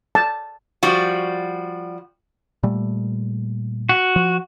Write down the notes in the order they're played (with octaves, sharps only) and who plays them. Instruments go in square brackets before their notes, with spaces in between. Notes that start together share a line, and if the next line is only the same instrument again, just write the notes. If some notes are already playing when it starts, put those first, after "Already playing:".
[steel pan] A5
[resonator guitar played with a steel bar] F3 G3 F#4
[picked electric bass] A#2 G3 A3
[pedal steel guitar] F#4
[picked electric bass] F3